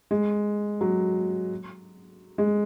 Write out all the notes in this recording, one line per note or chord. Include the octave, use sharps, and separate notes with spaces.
G#3
F#3
G#3